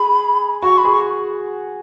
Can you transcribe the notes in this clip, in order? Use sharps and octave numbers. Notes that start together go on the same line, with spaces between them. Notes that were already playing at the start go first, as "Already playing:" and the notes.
Already playing: G#4 B5
F#4 C#6
B5
G#4
C#6